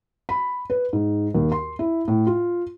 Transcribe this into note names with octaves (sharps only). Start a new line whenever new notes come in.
B5
B4
G#2
D#2
C6
E4
A2
F4